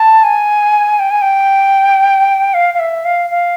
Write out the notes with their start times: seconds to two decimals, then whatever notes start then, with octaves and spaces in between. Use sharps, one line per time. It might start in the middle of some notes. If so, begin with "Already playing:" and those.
Already playing: A5
0.24 G#5
0.99 G5
1.11 G#5
1.22 G5
2.54 F5
2.74 F5
2.79 E5
3.05 F5
3.30 F5